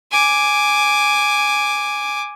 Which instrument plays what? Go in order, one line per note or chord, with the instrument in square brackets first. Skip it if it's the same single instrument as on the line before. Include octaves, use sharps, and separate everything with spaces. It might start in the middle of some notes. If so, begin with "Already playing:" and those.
[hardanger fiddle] G#5 D6